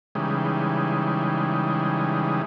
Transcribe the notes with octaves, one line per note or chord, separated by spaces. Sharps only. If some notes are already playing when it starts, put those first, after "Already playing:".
C#3 E3 G3 G#3 D#4